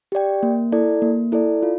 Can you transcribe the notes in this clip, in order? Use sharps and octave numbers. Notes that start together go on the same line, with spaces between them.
G4 D5 G5
A#3
E4 A4 D5
A#3
E4 A4 D5
F4